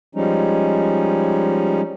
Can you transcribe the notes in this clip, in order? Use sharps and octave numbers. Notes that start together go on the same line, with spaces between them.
F3 G3 G#3 C#4 D#4